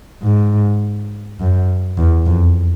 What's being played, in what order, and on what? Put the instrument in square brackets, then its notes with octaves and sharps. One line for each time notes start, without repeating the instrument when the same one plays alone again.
[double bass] G#2
F#2
E2
F2